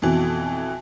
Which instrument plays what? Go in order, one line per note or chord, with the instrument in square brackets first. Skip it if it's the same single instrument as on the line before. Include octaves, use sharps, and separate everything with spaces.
[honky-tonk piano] F2 B2 E3